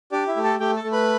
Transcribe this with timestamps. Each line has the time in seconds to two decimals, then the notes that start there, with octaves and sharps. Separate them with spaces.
0.12 D4 G4 D5
0.28 E4 E5
0.36 A3
0.44 A4 A5
0.60 A3 G4 G5
0.76 A4 A5
0.84 A3
0.92 B4 B5